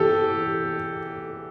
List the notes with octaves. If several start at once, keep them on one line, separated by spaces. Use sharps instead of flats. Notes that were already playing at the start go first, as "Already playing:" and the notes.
Already playing: E3 G4 A4